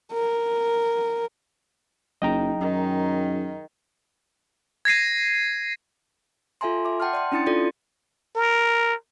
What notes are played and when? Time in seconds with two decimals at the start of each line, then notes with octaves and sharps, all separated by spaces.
0.13 A#4
2.22 F#1 F#3 D#4 G#4 D#5 G5 A#5
2.61 F#2 D#3
4.85 G#6 A#6 C7 D#7
6.61 F4 A4 E5 G#5 A#5 C6
6.85 E5 D6
7.00 F#5 G5 A5 C6 F6
7.13 D5 G5 C6
7.32 C#4 D4 E4 C6 A6 C#7
7.46 D4 F4 A4 D5
8.36 A#4